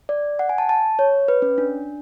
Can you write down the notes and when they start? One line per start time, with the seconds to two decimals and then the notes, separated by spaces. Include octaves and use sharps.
0.09 D5
0.39 F#5
0.49 G#5
0.58 A5
0.69 A5
0.99 C#5
1.28 B4
1.42 C#4
1.58 D4